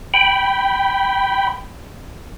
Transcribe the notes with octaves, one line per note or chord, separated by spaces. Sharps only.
G5 B5